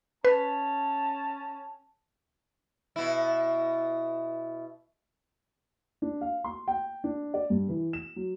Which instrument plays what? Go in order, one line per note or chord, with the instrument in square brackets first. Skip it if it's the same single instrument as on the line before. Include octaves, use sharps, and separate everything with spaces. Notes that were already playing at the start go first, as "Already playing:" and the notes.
[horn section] C#4 A5 [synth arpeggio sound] B4
[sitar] B2 E4
[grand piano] D4
F5
C6
G5
D4
D5
G2
E3
E7
F#3